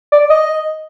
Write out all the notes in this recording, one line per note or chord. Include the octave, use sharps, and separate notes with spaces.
D5
D#5